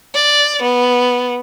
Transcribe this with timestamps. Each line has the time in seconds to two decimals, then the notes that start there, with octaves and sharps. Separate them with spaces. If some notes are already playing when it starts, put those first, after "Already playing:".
0.15 D5
0.63 B3